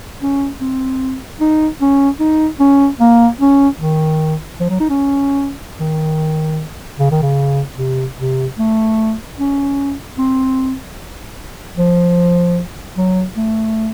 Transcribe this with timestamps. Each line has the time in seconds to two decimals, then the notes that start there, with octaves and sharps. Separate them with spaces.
0.22 C#4
0.60 C4
1.40 D#4
1.81 C#4
2.20 D#4
2.60 C#4
3.00 A#3
3.40 C#4
3.79 D#3
4.60 F3
4.69 F#3
4.80 D#4
4.89 C#4
5.80 D#3
6.99 C#3
7.11 D#3
7.22 C#3
7.78 C3
8.18 C3
8.58 A3
9.38 C#4
10.18 C4
11.77 F3
12.97 F#3
13.37 A3